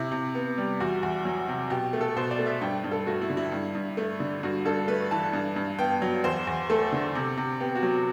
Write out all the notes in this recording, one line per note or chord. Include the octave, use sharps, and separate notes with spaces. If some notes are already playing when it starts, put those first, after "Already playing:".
Already playing: C3 E4
C3
B3
G3
E2 F#4
E2
F#3
C3
B2 G4
A3
A4
B2 C5
D5
A3
E5
G2 G5
G2
A4
A3 F#4
E4
D3
E4
G2
G2
A3
D3
G2 F#4
G2 A4
A3 B4
E3 A5
G2
G2
B3 G5
F#3
E2 C5
E2
A3 A4
D3
C3
C3
B3 G4
F#4
F#3